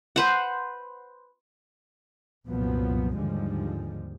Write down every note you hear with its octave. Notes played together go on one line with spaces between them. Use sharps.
B4 C5 F#5
C2 F#2 A#2 F3 F#3 B3
D#2 G#2 D3 F3 G3 G#3